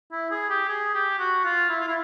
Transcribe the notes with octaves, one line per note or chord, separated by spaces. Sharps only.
E4
G#4
G4
G#4
G4
F#4
F4
E4
F4
E4